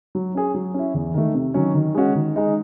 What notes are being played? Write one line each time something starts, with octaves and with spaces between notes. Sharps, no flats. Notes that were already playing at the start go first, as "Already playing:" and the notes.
F#3
C#4 G#4
F#3
C#4 E4
E2
D#3 A3
C3
D#3 F#3 C#4
D#3
G#3 C#4 F#4
D#3
G#3 D#4